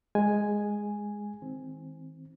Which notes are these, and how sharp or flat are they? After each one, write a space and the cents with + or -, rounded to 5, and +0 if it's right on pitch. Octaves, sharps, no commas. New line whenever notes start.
G#3 -5 G#5 +0
D#3 +40 C4 +0